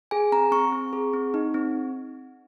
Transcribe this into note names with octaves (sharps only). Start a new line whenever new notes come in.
G#4 G#5
C4 A#5
C4 C#6
C4
G#4
C4
D#4
C4